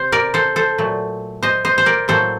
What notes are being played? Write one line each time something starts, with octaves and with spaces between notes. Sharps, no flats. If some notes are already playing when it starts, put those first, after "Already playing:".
Already playing: C3 C5
A#4 D5
A4 C5
A4 C5
A#2 F#3 A3
C5 D#5
C5 D#5
C5
A#4 D5
A2 F#3 A#3 A4 C5